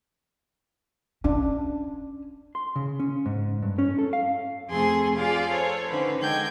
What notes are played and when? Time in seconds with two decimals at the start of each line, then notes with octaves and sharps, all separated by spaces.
1.24 C#4 D4
2.55 C6
2.76 C#3
3.00 C#4
3.26 G#2
3.62 G2
3.79 C#4
3.99 A4
4.13 F5
4.69 F2 C3 A3 G#4 A4 C6
5.16 F4 G4 G#4 D5 F5
5.49 A4 C5 C#5
5.89 D3 C#4 D#4 B4 C5
6.18 D3 G#3 D#5 G5 G6 G#6